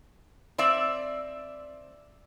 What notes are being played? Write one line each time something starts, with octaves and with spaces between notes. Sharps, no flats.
C4 D5 E5